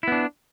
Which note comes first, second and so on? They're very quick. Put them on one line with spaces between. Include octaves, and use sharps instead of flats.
E4 B3 D4